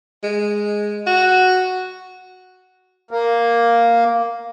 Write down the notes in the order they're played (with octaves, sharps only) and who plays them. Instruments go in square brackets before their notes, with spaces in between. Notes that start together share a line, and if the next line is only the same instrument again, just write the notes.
[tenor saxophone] G#3
F#4
[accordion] A#3